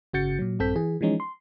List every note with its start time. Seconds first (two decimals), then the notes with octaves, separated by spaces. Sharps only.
0.13 G1 C#3 F#4 G6 A6 C#7
0.39 A#2 F#3
0.59 A#1 G2 C4 A4 G6 B6
0.76 E3 G#4
1.01 E3 F3 G#3 C#4 D#4
1.20 C6